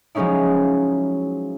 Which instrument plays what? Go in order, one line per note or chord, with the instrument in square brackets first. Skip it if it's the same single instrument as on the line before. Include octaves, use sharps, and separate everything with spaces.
[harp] F3 F#3 G#3 C#4 D#4 E4